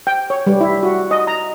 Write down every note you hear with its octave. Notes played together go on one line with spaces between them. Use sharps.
G5
C#5
G3
E4
F#4
D#5
A#5